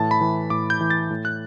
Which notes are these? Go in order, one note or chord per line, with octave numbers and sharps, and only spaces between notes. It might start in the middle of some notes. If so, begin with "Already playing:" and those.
Already playing: A2 E3 A5
B5
E3
A2 D6
G6
E3
A6
A2
F#6